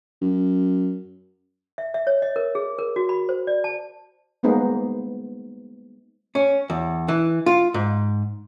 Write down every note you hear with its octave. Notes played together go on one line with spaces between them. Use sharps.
F#2
E5
E5
C#5
D#5
A#4
G#4
A#4
F#4
B5
C5
D5
A5
G3 G#3 A#3 B3 D#4 C5
C#4
E2
E3
F4
G#2